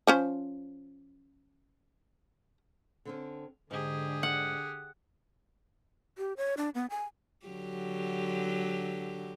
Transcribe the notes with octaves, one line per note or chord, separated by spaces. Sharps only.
F3 C#4 C5
D3 C4 C#4
G#2 D3 G4 G#4
F#5
G4
C#5
D4
B3
G#5
D3 F#3 G4